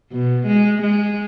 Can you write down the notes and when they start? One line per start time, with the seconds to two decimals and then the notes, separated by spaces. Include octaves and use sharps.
0.12 B2
0.47 G#3
0.83 G#3